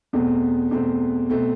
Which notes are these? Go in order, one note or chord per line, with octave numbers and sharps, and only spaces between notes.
E2 B2 A3 C4
E2 B2 A3 C4
B2 A3 C4